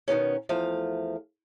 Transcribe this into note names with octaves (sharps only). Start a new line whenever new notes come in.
B2 D#3 B3 C#4
E2 F3 A3 F5